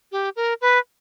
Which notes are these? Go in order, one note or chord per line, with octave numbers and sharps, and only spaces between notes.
G4
A#4
B4